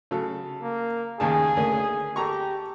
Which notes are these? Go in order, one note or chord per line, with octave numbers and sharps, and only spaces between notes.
C#3 F#3 A4
A#3
D#2 C#3 G#4 A5
D2 A#3 C#4
G4 A4 A#5 C#6